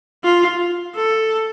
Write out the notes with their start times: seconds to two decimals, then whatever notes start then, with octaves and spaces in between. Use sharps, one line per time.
0.24 F4
0.95 A4